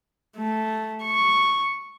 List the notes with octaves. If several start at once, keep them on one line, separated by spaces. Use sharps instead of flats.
A3
C#6